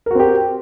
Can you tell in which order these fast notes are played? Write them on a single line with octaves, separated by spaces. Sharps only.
A#4 F#4 C4 G4